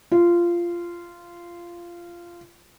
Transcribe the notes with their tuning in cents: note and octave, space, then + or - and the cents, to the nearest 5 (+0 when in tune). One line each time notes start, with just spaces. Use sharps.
F4 -15